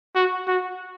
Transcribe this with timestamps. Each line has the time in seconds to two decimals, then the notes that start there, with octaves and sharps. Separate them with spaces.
0.15 F#4
0.48 F#4